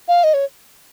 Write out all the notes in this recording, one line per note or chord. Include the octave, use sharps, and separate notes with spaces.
F5
D#5
C#5